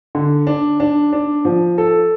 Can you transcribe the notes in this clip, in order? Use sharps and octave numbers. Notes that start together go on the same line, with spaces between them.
D3
D4
D4
D4
F3
A4